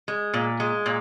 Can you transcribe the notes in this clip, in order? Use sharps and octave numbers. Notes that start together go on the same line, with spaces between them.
G#3
A#2
G#3
A#2